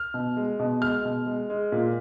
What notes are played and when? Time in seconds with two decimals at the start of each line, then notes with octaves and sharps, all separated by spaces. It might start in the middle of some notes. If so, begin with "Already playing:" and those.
Already playing: F6
0.14 B2
0.37 G#3
0.59 B2
0.81 G#3 F6
1.05 B2
1.27 G#3
1.50 G#3
1.72 A#2